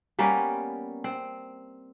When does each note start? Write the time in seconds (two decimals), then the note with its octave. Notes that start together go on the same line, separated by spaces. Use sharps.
0.19 G3 A#3 B3 C#4
1.04 C4